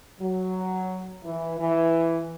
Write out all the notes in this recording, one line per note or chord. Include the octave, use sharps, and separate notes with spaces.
F#3
E3
E3